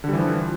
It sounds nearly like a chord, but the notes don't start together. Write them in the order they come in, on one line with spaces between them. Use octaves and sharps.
D3 G3 E3 F3